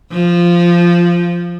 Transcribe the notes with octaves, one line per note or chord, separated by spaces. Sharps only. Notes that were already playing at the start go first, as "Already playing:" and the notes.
F3